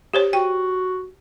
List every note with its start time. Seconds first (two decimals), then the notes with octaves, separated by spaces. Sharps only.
0.14 G4 C5 C#5
0.33 F#4 G5